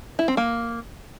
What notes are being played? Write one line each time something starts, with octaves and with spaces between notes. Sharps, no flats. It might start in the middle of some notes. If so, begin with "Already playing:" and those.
E4
C4
A#3